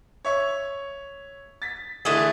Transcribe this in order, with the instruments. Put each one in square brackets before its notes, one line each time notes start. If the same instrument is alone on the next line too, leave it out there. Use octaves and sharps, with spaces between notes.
[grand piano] C#5 E5 C#6
A6 B6
[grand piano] D3 E3 E5 [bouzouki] A3 G#4